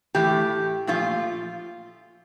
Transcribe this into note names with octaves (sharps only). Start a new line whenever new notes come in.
A2 E3 A3 G4
A#2 F3 A3 F4